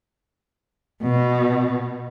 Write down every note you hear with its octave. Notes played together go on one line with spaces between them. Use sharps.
B2